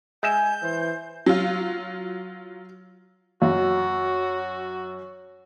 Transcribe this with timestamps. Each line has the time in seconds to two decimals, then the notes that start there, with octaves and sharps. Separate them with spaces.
0.23 G#3 E5 G#5 G6
0.62 E3 C5
1.26 F#3 F4
3.42 F#2 F#4